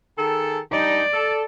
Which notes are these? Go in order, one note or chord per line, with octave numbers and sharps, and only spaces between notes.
D#3 G#4 A4
G3 D4 D#4 D5
A4